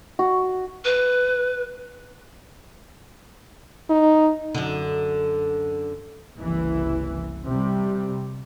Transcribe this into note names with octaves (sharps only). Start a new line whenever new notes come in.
F#4
B4
D#4
F#2 D3
F#1 C2 E3
C3 G3